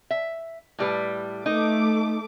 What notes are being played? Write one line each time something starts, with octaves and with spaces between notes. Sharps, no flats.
E5
A2 G3 B4
A3 D#4 D6